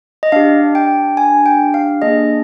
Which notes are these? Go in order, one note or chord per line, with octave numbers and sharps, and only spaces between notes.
D#5
D4 G4 F5
G5
G#5
G5
F5
A#3 D4 G#4 D#5